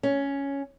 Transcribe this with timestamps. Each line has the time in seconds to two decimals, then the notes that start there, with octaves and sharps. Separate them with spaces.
0.03 C#4